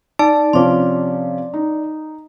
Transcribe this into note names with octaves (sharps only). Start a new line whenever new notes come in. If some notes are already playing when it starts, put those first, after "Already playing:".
D#4 D5 A5
C3 F3 C#4 C6 D6
D#4